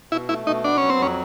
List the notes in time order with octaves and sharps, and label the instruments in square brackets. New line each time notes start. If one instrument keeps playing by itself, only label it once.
[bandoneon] B2 [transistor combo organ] E4
[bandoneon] A3 [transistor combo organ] E4
[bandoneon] B2 [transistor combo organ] D#4
[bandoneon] B3 [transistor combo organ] D4
[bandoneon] F#3 [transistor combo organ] C#4
[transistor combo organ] C4
[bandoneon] F2 [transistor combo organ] C#4